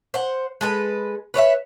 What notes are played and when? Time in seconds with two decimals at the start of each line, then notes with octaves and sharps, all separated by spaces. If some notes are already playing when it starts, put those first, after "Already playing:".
0.14 C5 F#5
0.61 G#3 A4 B4
1.34 B4 C#5 D#5 E5